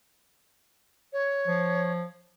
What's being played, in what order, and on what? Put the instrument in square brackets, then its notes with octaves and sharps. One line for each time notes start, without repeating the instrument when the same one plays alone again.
[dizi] C#5
[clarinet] F3